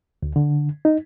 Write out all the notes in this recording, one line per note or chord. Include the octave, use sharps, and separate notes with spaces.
D2
D3
D#4